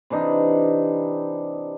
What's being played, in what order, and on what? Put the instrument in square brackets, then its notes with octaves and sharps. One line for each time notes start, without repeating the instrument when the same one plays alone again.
[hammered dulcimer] C3 E3 D4 D#4